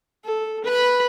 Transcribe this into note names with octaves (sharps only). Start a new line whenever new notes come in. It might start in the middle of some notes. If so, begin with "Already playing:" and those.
A4
B4 B5